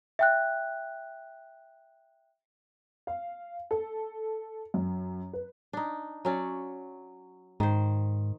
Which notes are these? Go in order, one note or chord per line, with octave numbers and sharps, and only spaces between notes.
E5 G5 F#6
F5
A4
F#2
B4
D4 D#4
F#3 C#4 D5
G#2 D#3 C5